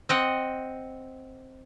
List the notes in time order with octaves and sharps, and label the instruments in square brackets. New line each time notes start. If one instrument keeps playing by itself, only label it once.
[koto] C4 D#5 F#5